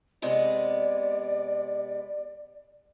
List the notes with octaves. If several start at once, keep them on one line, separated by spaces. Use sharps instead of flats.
C3 G#3 B3 D5